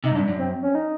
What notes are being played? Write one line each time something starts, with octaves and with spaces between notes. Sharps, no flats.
C3 D#4
G#2
G2 D4
F#2
C4
C#4
D#4